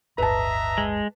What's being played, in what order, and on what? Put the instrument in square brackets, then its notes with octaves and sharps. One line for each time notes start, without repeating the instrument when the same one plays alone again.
[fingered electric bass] D1 G1 [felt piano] B4 A5 [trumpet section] D#5 E5 A#5
[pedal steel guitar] G#3